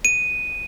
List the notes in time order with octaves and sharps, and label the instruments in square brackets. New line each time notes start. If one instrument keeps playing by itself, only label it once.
[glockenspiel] D#7